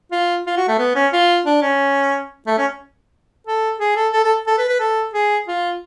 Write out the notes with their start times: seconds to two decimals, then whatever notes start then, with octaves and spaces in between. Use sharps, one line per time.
0.12 F4
0.46 F4
0.57 F#4
0.68 A3
0.79 B3
0.95 C#4
1.13 F4
1.46 D4
1.62 C#4
2.47 A3
2.58 C#4
3.47 A4
3.80 G#4
3.96 A4
4.13 A4
4.25 A4
4.47 A4
4.58 B4
4.69 B4
4.80 A4
5.14 G#4
5.47 F4